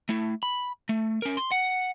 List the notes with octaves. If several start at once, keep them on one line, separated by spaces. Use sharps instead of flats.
A3 E4
B5
A3
C#4 A#4
C6
F#5